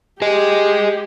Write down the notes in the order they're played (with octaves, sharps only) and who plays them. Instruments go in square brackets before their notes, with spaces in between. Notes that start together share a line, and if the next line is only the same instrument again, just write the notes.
[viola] G4 [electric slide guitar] G#4 D#5